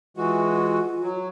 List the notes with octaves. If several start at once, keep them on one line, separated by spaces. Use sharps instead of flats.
E3 G#3 F4 F#4
F#3